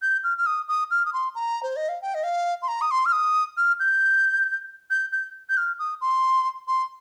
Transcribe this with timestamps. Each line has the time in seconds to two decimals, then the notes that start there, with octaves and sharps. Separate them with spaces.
0.02 G6
0.24 F6
0.38 F6
0.46 D#6
0.68 D#6
0.91 F6
1.06 D#6
1.13 C6
1.35 A#5
1.63 C5
1.76 D#5
1.89 F5
2.02 G5
2.14 D#5
2.24 F5
2.62 C6
2.68 A#5
2.81 D#6
2.91 C6
3.05 F6
3.12 D#6
3.57 F6
3.80 G6
4.91 G6
5.12 G6
5.49 G6
5.57 F6
5.79 D#6
6.01 C6
6.68 C6